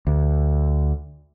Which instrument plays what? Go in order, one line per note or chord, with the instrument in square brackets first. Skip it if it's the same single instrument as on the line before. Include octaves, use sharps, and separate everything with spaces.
[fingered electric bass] D2